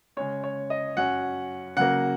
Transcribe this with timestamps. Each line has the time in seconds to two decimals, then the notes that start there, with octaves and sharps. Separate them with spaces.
0.17 C#3 G#3 C#4 C#5
0.44 C#5
0.70 D#5
0.97 F#2 F#3 C#4 F#5
1.77 C#3 F#3 A#3 F#5